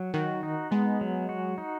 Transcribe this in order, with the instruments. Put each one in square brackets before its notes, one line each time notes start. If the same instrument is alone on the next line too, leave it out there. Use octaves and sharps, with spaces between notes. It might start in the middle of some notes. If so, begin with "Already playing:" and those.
Already playing: [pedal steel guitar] F#3
[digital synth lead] D#3 [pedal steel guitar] F#4
[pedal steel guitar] D#4
[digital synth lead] G#3 [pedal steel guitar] B3
[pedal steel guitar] F#3
F#4
D#4